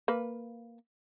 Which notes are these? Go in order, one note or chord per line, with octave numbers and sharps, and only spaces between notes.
A#3 B4